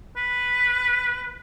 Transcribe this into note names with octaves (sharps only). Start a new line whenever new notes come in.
B4